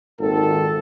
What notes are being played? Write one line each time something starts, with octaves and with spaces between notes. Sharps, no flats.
G#1 A#2 D#3 A4